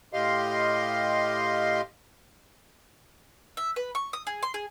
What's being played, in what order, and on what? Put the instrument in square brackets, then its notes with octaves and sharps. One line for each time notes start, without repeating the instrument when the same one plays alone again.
[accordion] A2 G4 D#5 F5 C6
[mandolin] E5
B4
C#6
D#6
G#4
C6
G#4